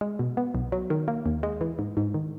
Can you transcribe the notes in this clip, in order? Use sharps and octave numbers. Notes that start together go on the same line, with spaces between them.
G#3
B2
B3
B1
F#3
D#3
A#3
D#2
G#3
E3
G#2
G#2
D#3